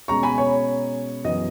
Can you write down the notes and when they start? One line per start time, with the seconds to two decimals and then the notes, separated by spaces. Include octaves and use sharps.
0.08 B2 G#3 C#4 A#5 C#6
0.23 G#5 B5
0.38 C#5
1.25 F#2 E3 B3 D#5